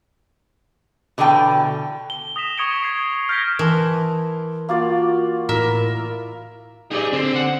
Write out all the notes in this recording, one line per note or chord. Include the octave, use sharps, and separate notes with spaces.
B2 D3 E3 G4 G5 A5
G7
D#6 A#6 B6 E7 F7
C#6 D#6 G#6 C#7 D7 G7
G#6 C7 D7
F6 G6 G#6 A#6 B6 D7
E3 A#4 A5 C6
A#3 F4 F#4 D5
A2 E4 A#4 E5
D#4 G4 G#4 D5
D3 C4
F#5